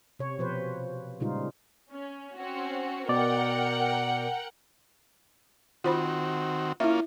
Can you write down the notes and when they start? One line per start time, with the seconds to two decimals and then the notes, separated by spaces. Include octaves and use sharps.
0.19 C3 C#5
0.38 B2 F3 B4 C5
1.20 A#2 C#3 G3 G#3 D#4 F4
1.91 C#4
2.36 C4 C#4 F#4
3.09 B2 A#4 D5 F#5 G5
5.84 D#3 C4 F4 F#4 C5 B5
6.80 A#3 C#4 E4 F4 E5